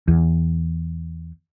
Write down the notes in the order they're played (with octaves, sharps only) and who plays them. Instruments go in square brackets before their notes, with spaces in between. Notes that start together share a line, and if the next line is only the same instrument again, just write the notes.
[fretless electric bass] E2